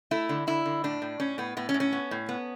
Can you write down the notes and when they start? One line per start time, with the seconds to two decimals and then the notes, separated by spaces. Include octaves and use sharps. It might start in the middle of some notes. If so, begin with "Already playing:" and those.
0.11 A3 E4
0.29 D3
0.47 D3 E4
0.66 D3
0.84 A2 D4
1.02 A2
1.20 A2 C#4
1.38 A2 B3
1.57 A2 B3
1.69 C#4
1.74 A2
1.80 C#4
1.92 B3
2.11 A2
2.29 B3